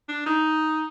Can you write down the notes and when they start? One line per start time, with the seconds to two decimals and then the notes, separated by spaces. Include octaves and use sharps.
0.09 D4
0.26 D#4